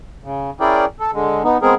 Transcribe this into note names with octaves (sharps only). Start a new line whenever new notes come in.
C#3
C#4 E4 G#4 A#4 D5 G5
A4
D3 G#3
B3 D#4
G#3 B3 C4 G#4 A#4